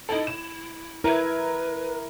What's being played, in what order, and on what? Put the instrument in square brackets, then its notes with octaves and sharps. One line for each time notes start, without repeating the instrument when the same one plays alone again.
[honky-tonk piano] D#4 A4 [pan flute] E4
[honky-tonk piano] E7
[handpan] E4 [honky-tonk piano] A#4 G#6 [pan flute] B4